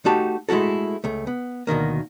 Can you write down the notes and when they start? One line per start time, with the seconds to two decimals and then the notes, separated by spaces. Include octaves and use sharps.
0.05 A3 D#4 F#4 G4 A5
0.49 G#3 A3 E4 F#4 A4
1.04 C#2 A3
1.27 B3
1.67 D2 B2 D#3 A#3